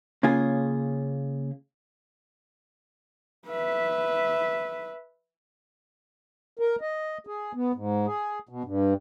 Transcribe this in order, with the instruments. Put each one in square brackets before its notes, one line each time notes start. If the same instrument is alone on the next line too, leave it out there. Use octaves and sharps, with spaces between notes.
[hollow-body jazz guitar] C#3 A#3 C#4 F4 G#4
[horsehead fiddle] B4 E5
[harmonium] A#4
D#5
G#4
B3
G#2
G#4
B2
G2